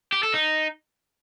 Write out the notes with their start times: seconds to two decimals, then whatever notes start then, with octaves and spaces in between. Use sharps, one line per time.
0.12 G4
0.23 A4
0.34 D#4